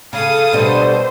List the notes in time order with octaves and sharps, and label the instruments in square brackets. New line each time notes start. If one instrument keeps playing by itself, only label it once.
[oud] C#3 [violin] A4 D#6 [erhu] F5
[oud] B2 G3 [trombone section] D3 B3 D4 [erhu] C5